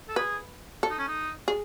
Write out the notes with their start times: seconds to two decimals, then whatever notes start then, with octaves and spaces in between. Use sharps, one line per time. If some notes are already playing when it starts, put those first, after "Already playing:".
0.09 A4
0.16 G#4 B4
0.83 A4
0.90 D#4
0.99 C#4
1.08 D#4
1.48 G#4